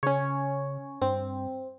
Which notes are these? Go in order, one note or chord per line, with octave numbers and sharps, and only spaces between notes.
C#3 C#4 C#5
G2 C4